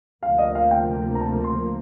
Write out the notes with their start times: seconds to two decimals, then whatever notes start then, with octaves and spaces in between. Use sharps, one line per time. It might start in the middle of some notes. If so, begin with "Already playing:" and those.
0.23 D2 C3 F3 A#3 F5
0.38 D#5
0.55 F5
0.71 G5
1.15 A#5
1.20 A5
1.44 C6